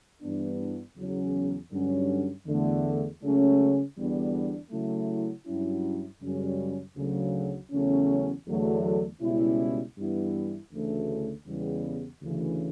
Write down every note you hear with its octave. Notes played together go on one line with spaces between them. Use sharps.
G2 E3 B3 D4
E2 C#3 F#3 C#4
G2 D3 F#3 C#4
E2 D3 A3
C#2 C#3 F#3 A3 C#4
E2 D3 G3 B3 D4
C#3 F#3 A3 E4
G2 F#3 C#4 E4
F#2 C#3 G3 C#4
D2 C#3 F#3
E2 C#3 F#3 A3 C#4
E2 D3 F#3 A3
C#2 B2 G3 C#4 E4
G2 E3 G3 B3 E4
D2 C#3 E3 A3
E2 C#3 G3 B3
D2 C#3 E3